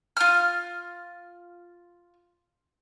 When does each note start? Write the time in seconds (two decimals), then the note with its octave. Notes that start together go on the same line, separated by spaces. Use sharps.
0.17 F4 F6